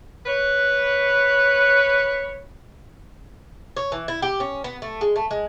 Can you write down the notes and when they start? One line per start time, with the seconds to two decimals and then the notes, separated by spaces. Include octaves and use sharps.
0.26 B4 C#5
3.77 C#5
3.92 E3
4.08 E4
4.22 G4
4.40 C#4
4.64 B3
4.82 A3
5.01 G#3
5.16 A3
5.31 G#3